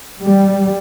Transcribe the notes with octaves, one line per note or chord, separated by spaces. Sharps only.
G3